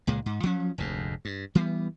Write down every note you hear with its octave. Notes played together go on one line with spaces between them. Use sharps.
C#2 A#2 G#3
G#2
F3 F#3 C#4
F1 D2 G#2
G2
E3 G3 B3